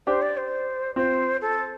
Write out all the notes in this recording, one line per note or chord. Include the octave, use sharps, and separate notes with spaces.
D4 G4 C5
D5
C5
C4 F4 C5
A4